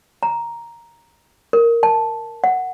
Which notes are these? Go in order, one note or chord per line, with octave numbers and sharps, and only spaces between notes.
A#5
A#4
A5
F#5